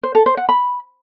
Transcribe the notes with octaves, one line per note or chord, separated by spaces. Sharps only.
C5
A4
C5
F#5
B5